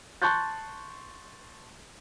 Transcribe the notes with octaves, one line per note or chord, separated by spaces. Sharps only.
A5 C6 C#6 F#6 G6 A6